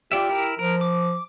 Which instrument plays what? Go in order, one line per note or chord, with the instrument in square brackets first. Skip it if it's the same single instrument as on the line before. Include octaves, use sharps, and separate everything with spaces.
[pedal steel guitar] F4 D5 E5 [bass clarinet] G4
[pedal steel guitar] E4 A#4
[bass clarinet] F3 [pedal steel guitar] A#4
[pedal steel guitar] D6